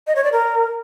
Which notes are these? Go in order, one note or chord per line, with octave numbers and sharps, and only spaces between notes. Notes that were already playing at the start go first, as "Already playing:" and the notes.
D#5
C#5
D5
A#4